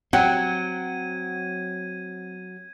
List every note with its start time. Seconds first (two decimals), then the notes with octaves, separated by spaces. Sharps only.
0.13 F#3 C4 F#5 G5 G#6 D#7